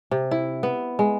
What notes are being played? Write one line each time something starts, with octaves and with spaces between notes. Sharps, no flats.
C3
E4
B3
G#3